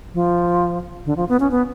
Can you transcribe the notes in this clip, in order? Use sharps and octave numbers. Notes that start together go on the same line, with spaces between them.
F3
D3
F3
B3
C#4
B3